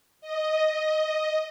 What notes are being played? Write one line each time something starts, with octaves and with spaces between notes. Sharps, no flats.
D#5